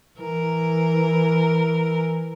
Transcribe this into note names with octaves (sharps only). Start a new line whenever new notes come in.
E3 A#4